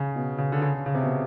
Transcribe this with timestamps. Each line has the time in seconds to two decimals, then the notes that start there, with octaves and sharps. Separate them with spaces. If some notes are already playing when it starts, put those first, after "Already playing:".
Already playing: C#3
0.16 B2
0.38 C#3
0.52 D3
0.62 C#3
0.86 C#3
0.95 C3
1.03 B2